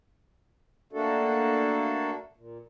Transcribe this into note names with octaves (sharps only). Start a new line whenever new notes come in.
A3 A#3 D4 F#4 A4
A#2